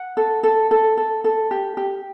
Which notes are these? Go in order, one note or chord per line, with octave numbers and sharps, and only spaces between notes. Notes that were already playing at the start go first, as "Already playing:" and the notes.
Already playing: F#5
A4
A4
A4
A4
A4
G4
G4